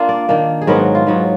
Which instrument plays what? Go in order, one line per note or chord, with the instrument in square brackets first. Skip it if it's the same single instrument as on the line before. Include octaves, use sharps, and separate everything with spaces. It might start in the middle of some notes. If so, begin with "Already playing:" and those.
Already playing: [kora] A#3 D4 F4
D5
D#3 A#3 D4
G#4
G#2 F#3 B3 A#4
F4
G#2 F#3 B3